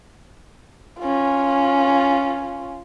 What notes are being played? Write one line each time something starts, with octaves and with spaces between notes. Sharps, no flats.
C#4 F4